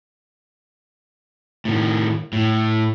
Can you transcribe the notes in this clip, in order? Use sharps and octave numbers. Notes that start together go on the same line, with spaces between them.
A2 D#3
A2